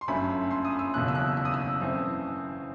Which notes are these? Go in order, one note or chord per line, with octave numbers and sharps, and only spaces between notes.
C6
G1 F#2 F#3 A3 B5
C6
D#6
E6
F#1 E2 B2 A3 F#6
E6
F#6
E6
D#6
E6
F#2 E3 A3 C4